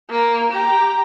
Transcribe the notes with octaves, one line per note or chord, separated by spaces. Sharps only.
A#3
G4 A#5